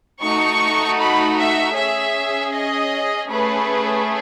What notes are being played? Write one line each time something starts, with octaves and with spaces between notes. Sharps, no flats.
A3 D#4 F#4 C#6
B5
E5
C#4 G#4 E5
D#5
A3 C#4 G#4 B4